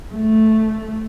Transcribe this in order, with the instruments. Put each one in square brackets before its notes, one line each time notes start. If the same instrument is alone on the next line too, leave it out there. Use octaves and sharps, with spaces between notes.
[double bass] A3